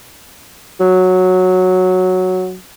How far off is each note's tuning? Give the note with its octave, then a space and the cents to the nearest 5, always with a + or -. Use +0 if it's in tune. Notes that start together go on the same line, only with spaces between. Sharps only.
F#3 -5